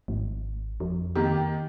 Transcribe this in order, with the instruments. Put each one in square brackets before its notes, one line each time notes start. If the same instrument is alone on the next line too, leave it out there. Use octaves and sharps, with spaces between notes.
[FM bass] G#1
F2
[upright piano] D#3 A#3 G4